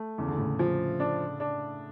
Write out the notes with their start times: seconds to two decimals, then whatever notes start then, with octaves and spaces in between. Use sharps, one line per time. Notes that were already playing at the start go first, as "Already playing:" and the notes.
Already playing: A3
0.18 E2 C#3
0.28 D3
0.38 A2 C#3
0.59 F3
1.00 D4
1.40 D4